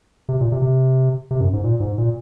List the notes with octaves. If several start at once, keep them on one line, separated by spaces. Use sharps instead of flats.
C3
A#2
C3
C3
C3
F#2
G#2
A#2
G#2
A#2